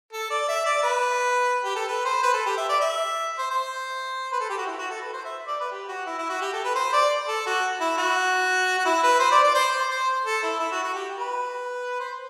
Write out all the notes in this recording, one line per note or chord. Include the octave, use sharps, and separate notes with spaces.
A4
D5
E5
D5
B4
G4
A4
B4
C5
B4
A4
G4
E5
D5
E5
C5
C5
B4
A4
G4
F#4
E4
F#4
A4
B4
C5
E5
D5
B4
G4
F#4
E4
E4
F#4
G4
A4
B4
C5
D5
A4
F#4
E4
F#4
F#4
E4
B4
C5
D5
D5
C5
C5
C5
A4
E4
E4
F#4
F#4
G4
B4
C5